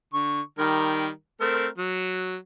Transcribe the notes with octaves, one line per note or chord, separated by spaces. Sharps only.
D3 C#6
D#3 G3 A#4
A3 C4 A#4
F#3